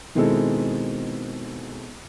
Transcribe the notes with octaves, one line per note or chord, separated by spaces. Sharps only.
B2 D#3 G#3 C4 E4 A4